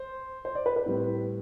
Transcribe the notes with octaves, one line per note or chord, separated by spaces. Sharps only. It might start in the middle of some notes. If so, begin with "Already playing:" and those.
Already playing: C5
C5
D5
B4
B4
A2 G3 C4